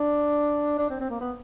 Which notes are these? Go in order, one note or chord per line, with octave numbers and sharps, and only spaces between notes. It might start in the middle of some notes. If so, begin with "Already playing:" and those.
Already playing: D4
D4
C4
C4
A#3
B3